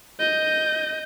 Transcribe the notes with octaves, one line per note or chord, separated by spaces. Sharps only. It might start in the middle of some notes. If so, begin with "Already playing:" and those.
D#5 G6